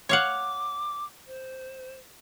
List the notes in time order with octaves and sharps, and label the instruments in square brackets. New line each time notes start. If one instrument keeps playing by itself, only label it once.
[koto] C#5 F5 F#5 [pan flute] D6
[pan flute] C5